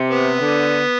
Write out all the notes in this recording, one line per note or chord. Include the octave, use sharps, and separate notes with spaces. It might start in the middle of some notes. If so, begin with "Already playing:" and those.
Already playing: C3
B3
D3